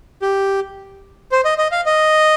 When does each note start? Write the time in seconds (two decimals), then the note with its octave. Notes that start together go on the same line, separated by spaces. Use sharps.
0.22 G4
1.32 C5
1.45 D#5
1.58 D#5
1.72 F5
1.86 D#5